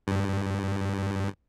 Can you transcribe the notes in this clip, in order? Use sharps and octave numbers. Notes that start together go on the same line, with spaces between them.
G2